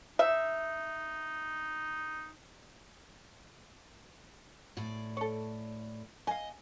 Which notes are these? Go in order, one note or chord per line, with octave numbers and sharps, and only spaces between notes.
D#4 E5
A2 D5
A4 C#5
D#5 F5 G#5